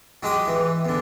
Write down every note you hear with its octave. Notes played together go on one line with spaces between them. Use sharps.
F#3 G#3 G4 D#6
E3
E2 D3